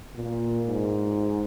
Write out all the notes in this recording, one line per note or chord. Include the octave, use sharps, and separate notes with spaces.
A#2
G#2